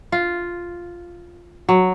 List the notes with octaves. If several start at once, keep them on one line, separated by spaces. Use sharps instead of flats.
F4
F#3